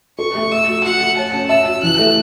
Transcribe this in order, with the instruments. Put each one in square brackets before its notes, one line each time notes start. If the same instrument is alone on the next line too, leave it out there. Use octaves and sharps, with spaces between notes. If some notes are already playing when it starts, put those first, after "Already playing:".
[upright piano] A4 [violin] C#6
[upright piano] A3
[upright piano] E5 [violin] E6
[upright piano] F#4
[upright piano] F#4 [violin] F#5
[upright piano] A3
[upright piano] C#5 [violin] A5
[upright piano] C#4
[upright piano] E5 [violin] E6
[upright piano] F#4
[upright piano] E3 [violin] F#6
[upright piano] A3